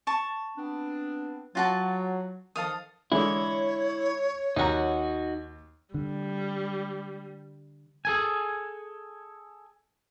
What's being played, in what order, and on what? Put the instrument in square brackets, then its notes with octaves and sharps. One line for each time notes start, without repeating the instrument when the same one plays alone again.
[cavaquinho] A5 C#6
[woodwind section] B3 C4 D4
[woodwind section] F#3 [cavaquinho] F4 F#4 A5
[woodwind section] D#3 F3 [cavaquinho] A4 F5 D#6
[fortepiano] D3 E3 G#3 [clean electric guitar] E4 [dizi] C#5
[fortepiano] D#2 F#5 A#5 [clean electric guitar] D#4 F#4
[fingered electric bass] D3 [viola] G3
[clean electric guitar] G#4 A4 G#5